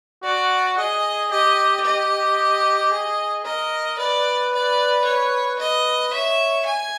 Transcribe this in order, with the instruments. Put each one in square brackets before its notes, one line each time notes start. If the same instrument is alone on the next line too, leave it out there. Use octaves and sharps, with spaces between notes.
[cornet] F#4 [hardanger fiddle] D5
[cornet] G#4 [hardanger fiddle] D#5
[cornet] G4 [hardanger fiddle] D#5
[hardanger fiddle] D#5
[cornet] G#4
[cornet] A#4 [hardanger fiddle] D#5
[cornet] B4 [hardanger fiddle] D5
[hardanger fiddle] D5
C#5
[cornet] B4 [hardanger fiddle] D#5
[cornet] C#5 [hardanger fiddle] E5
[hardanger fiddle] G#5